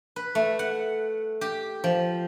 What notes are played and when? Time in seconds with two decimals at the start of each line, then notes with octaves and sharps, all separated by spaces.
0.16 B4
0.35 A3
0.59 F#5
1.41 G4
1.84 F3